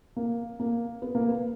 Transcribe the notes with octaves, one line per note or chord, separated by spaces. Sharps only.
A#3
A#3
B3
A#3
B3